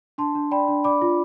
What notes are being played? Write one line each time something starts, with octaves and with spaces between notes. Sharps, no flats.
D4 A5 C6
D4
D5 G5 B5
D4
D5 B5 D6
F4